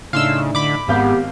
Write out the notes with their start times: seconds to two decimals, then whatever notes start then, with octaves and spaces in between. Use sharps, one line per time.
0.13 A2 C#3 D4 D#4 F5 C6 E6
0.55 D3 B5 D6
0.88 G#1 G#2 B3 G4 F5 G6